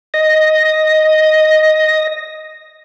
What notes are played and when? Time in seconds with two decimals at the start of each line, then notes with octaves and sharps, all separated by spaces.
0.14 D#5 A#6